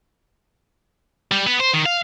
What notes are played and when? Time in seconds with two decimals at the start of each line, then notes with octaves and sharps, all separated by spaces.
1.32 G3
1.47 B3
1.60 C5
1.74 D#3
1.86 F5